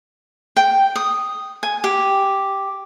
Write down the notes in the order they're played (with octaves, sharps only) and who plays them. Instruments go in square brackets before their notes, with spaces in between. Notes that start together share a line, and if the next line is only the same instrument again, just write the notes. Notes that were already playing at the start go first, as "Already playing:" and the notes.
[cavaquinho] G5
D#6
G#5
G4